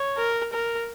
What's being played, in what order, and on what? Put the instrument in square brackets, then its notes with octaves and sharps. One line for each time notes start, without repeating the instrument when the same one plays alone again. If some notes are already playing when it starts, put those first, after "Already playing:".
Already playing: [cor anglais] C#5
[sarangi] A#4
A#4